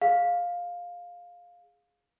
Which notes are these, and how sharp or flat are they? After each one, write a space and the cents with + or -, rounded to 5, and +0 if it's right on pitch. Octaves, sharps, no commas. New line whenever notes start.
G#4 +0 F5 +10